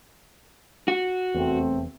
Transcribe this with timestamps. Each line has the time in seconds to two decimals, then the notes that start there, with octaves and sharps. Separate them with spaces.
0.88 F#4
1.34 F1 E2 A3 C4